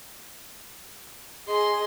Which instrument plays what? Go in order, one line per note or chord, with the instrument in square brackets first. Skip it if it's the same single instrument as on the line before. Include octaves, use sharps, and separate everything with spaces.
[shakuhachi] G#4 [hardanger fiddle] D#5 C6